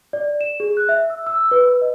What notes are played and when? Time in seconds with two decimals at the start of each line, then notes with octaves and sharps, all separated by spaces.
0.13 D5
0.41 E7
0.60 G#4
0.77 F#6
0.89 E5
1.10 E6
1.27 E6
1.51 B4
1.82 D#5